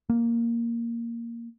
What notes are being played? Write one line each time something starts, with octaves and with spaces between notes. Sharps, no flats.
A#3